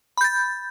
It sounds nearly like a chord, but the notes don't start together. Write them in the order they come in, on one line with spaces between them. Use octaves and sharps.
B5 G6 A6